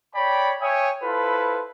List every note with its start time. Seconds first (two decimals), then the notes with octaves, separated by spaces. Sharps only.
0.15 C#5 D5 G5 B5
0.60 C#5 E5 G5 G#5 D#6
1.03 E4 F4 A4 B4 C5